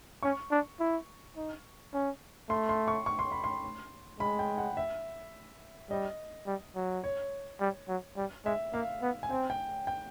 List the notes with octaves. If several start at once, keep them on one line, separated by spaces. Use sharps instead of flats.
C#4 C#6
D4
E4
D#4
C#4
A3 C6
C6
C#6
C#6
C6
B5
C6
G#3 B5
G5
F#5
E5
G3 D#5
G3
F#3
C#5
G3
F#3
G3
G#3 E5
A#3 F5
B3
G#5
C4 G5
G5
G5